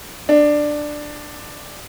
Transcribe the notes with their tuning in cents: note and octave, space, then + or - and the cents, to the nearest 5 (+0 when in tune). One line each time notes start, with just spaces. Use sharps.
D4 +10